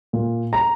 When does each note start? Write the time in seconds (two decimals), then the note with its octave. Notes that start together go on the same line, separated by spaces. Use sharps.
0.13 A#2
0.53 A#5